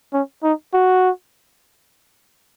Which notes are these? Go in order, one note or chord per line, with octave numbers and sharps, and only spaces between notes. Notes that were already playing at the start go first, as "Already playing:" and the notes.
C#4
D#4
F#4